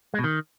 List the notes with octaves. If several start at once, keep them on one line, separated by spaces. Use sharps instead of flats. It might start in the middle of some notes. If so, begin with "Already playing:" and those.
G#3
B2
D#3